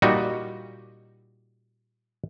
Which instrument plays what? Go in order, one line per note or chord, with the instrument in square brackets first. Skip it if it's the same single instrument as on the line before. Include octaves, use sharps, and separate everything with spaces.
[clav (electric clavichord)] A#2 G3 D#4 F#4